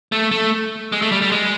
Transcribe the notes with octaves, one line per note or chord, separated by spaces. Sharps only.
A3
A3
G#3
A3
G3
G3
G#3